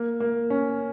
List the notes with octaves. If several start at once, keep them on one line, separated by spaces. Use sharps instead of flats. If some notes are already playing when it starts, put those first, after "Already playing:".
Already playing: A#3
A#3
C#4